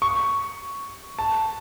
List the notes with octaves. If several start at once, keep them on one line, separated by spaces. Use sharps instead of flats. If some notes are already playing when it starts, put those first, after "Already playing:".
C#6
A5